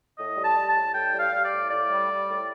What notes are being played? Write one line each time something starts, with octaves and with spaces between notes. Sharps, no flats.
A2 D#5
G3
A5
G3
A5
A2
A2 G5
G3
F5
G3
D5
A2
A2 D5
G3
G3
A2